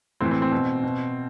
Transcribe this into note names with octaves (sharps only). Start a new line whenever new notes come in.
A2 E3 C4
C4
C4
B2
B2